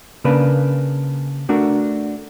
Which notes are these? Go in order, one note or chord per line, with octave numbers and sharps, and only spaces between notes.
C#3 A#3 D4 B4
A3 D4 F#4 A#4